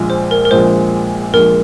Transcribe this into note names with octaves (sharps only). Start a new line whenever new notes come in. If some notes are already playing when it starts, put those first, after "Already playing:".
Already playing: A#1 A#2 G#3
C5
A#4
A#4
A#1 A#2 G#3 C5
A#1 A#2 G#3 A#4